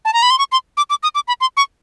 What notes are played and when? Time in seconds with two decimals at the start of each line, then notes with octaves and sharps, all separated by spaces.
0.05 A5
0.13 A#5
0.22 B5
0.30 C6
0.38 C#6
0.52 C6
0.77 D6
0.90 D6
1.03 D#6
1.15 D6
1.28 B5
1.41 C6
1.57 C#6